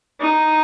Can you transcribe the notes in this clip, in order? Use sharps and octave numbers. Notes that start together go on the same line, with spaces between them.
D#4